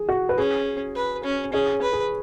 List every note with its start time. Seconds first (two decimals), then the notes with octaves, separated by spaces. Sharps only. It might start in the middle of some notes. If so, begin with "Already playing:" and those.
Already playing: G#4
0.09 F#4
0.29 B4
0.38 C#4 G#4
0.96 B4
1.24 C#4
1.53 C#4 G#4 C#5
1.82 B4
1.93 G#4